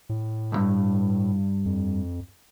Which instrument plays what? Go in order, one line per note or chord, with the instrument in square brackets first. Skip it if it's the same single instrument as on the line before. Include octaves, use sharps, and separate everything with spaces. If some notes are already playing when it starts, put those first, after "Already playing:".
[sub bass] A2
[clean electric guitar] B1 G2
[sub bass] F2